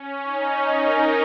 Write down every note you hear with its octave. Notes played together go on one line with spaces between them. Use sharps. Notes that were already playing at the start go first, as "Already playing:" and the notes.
Already playing: C#4
D#4
A#4